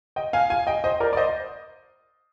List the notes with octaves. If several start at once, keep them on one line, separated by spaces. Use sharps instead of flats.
D#5 G5
F5 G#5
F5 G#5
D#5 G5
C5 D#5
A#4 D5
D5
C5 D#5